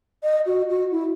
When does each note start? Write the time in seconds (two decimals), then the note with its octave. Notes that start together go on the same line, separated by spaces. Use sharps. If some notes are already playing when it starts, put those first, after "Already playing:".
0.24 D#5
0.46 F#4
0.69 F#4
0.91 E4